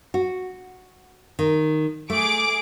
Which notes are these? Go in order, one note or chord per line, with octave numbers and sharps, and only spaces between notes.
F#4
D#3
A3 G#4 D6 D7